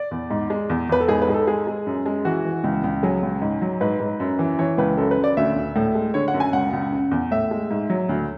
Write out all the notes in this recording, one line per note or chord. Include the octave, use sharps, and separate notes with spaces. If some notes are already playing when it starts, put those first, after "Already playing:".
Already playing: D5
E2
G#2
G#3
E2
E2 B4
A4
G#2 G#4
B4
G#2 G#4
A4
G#3 G#4
G#3
F#2
G#3
E3 F#4
E3
C#2
C#2
F#3 G#4
C#2
G#2
F#3
G#2 B4
G#2
F#2
E3
E3 C#5
C#2 B4
F#2 A4
B4
F#2
D5
D2 E5
D2
A2
G#3
D3 C#5
F#5
F#2
G#5
C#2 F#5
C#2
C#3
E2
A2 E5
G#3
G#2
F#3
D2